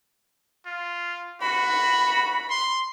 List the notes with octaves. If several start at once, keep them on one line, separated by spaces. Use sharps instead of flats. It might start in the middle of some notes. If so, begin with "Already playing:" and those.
F4
F#4 B5
C6